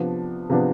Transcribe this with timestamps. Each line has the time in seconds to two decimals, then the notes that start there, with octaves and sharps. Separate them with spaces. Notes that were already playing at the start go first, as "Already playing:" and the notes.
Already playing: C3 F3 B3 D4
0.50 C3 F3 B3 D4